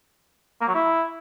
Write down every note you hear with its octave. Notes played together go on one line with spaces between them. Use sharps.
A#3
F#3
E4